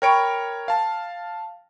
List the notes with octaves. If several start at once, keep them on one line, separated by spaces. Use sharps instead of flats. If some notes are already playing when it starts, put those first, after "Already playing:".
A#4 C#5 G5 B5 C#6 D7
F5 A5